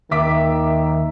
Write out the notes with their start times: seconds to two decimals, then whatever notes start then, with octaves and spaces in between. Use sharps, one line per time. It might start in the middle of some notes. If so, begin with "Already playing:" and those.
0.11 D#2 D#3 E5 D6 B6